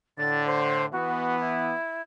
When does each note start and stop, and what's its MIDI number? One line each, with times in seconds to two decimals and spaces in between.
0.18 0.86 45
0.18 0.86 50
0.18 0.45 93
0.46 0.86 72
0.92 1.72 52
0.92 1.72 59
0.92 1.39 66
1.40 2.02 64